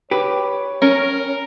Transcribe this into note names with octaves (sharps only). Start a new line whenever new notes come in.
G4 B4 C#5
C#4 A#4